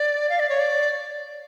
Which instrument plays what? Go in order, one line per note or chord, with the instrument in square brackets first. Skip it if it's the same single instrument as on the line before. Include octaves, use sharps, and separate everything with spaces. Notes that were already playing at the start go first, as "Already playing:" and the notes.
Already playing: [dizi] D5
F5
D5
C#5
D5